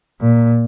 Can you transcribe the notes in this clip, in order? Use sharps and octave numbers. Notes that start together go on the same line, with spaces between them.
A#2